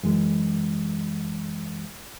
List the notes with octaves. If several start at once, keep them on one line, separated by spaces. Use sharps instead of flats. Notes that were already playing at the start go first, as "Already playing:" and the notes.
F#2 E3 G#3